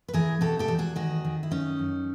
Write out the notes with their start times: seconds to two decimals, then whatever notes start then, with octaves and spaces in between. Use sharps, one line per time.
0.08 B4
0.13 E3 G#4 A#4
0.41 B2 G4 A4
0.59 G4 A4
0.68 E2
0.78 F#4 G#4
0.96 D#3 F#4 G#4
1.24 D#3
1.43 E4
1.51 F#2 C#4 D#4
1.79 F#2